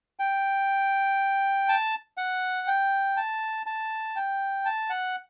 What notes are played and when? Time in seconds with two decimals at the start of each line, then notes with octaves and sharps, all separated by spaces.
0.19 G5
1.69 A5
2.17 F#5
2.67 G5
3.17 A5
3.66 A5
4.16 G5
4.65 A5
4.90 F#5